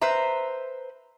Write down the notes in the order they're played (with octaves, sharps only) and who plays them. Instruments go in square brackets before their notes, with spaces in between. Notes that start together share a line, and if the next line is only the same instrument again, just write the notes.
[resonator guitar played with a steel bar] B4 C5 E5 A#5